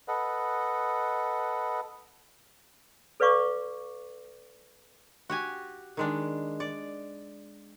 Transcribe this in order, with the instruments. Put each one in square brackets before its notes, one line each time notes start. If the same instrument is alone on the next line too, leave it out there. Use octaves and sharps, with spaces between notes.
[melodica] A4 B4 D#5 F#5
[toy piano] A4 B4 D5 F5 C#6 D6
[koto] F#4 G4 G#5
D#3 G#3 D4
D5